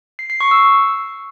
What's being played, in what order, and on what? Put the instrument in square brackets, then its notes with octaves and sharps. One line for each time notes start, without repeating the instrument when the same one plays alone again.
[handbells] C7
C7
C#6
E6